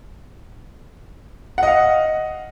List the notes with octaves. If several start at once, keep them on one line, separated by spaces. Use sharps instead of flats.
D#5 F5 F#5